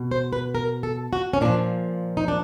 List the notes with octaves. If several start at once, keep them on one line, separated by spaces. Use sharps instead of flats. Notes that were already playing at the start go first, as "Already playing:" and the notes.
Already playing: B2
C5
B4
A#4
A4
F#4
C#4
A#2 F3 D4
D#4
D4